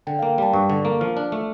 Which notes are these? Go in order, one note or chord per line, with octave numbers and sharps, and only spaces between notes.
D3 G5
A#3 F5
G5
G3 A5
G2 C#6
D3
A#3
F3 F6
D4
A3